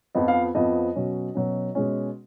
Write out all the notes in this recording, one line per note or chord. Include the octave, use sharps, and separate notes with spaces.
F2 F3 B3 D#5
F5
F2 F3 B3 D#5
B2 F#3 C#4
B2 F#3 C#4
B2 G#3 C#4